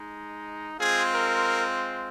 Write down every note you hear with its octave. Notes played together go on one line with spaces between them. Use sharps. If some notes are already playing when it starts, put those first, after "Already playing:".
Already playing: G#3 D#4
G#3 C4 F4 G#4
A#4